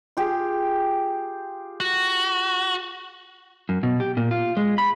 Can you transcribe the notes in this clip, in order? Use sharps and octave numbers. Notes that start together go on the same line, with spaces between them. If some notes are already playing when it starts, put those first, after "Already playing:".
F4 G4 G#4
F#4
F#2
B2
G4
A#2
F4
G#3
B5